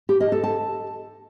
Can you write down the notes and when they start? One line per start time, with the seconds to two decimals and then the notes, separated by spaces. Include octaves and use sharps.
0.09 G4
0.20 D#5
0.32 A4
0.44 A5